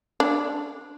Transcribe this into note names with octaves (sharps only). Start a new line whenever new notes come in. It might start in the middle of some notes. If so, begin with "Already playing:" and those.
D4